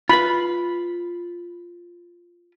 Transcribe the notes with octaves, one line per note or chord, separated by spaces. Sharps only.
F4 B4 B5